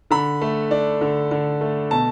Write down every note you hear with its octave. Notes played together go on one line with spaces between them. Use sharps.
D3 B5
A3
D4
D3
D3
A3
B2 A5